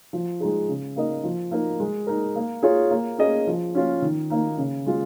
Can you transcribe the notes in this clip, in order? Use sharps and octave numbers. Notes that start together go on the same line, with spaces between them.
F3
G#3 D#4 G#4
C#3
A#3 D#4 A#4 D#5
F3
A#3 D#4 A#4
G#3
D#4 A#4
A#3
F4 G#4 C#5
A#3
C#4 G#4 D#5
F3
C#4 F4
D#3
A#3 D#4
C#3
G#3 F4